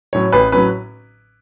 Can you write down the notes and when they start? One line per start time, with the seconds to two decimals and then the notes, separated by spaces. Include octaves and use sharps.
0.13 A2 F#3 C#4 C#5
0.33 A1 B4
0.52 A2 F#3 C#4 B4